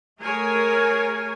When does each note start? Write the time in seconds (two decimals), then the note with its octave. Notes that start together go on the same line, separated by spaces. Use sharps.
0.20 A3 G#4 A#4 C#5 G#5